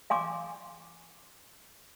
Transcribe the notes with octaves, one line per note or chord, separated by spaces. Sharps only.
F5 G#5 C6 D6